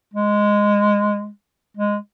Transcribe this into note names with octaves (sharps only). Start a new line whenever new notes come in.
G#3
G#3